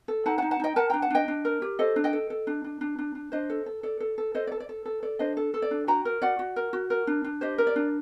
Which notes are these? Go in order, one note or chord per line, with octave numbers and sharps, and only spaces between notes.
A4
D#4 F#5 A5
F#5 A5
D#4
F#5 A5
D#4 D#5 G5
A#4 F#5 A5
D4 G5 A#5
F#5 A5
D4 D#5 G5
D4
A#4
G4
A4 C5 D#5
D4
D#5 G5
A4
A4
D4
D4
D4
D4
D4
D4 C5 D#5
A4
A4
A4 D5
A4
A4
A4 C5 D#5
D5
A4
D5
A4
A4
A4 D5
D4 C5 D#5
A4
A4
D5
D4
F#4 G5 A#5
A#4
F#4 D5 F#5
F#4
A#4
F#4
A#4
D4
D4
G4 C5 D#5
A#4
D5
D4